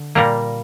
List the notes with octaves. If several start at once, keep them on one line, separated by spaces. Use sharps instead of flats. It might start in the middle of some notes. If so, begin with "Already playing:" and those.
Already playing: D3
A#2 G3 A#3 A#5